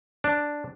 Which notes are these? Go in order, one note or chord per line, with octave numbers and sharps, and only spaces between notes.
D4